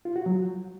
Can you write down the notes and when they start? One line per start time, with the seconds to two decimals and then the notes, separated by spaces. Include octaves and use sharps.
0.05 F4
0.16 F#4
0.26 F#3